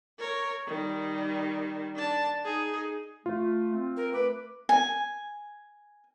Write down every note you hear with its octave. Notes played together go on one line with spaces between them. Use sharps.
A#4 C#5
D#3 G3
D4 A5
D#4 G#4
A3 F4
C4
A#4
A3 B4 D6
G#5